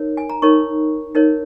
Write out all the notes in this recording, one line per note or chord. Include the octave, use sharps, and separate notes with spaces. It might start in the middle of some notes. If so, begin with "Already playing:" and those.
Already playing: D#4 A#4 C#5
G#5
A#5
D#4 A#4 C#5 C#6
D#4 A#4 C#5